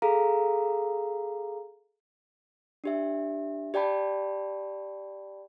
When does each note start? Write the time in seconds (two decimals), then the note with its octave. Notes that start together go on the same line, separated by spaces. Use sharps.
0.02 G#4 A4 F5 A#5
2.84 D4 G4 E5
3.74 G4 D5 G5 A5 B5